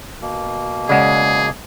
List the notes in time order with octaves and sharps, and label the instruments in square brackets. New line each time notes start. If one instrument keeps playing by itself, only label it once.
[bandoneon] B2 A#3
[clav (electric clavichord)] C#3 G#3 [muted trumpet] G#4 [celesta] D5 F#5